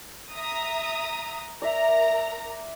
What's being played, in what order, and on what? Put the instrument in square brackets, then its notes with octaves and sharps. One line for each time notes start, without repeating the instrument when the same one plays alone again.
[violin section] E5 A#5 D#6
[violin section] A#4 A#5 [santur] D5 E5